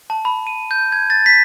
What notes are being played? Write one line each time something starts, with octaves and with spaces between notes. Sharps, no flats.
A5
B5
D#7
G6
G#6
A6
B6